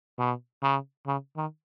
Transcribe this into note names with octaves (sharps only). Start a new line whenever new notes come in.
B2
C#3
C#3
D#3